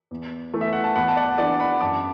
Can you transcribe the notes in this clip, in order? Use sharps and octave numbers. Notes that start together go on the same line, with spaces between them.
E2
E3 A3
E5
F#5
A5
E2 F#5 B5
A5
D5 F#5
E3 D4 D5 F#5
F#5 B5
F#2 A5 D6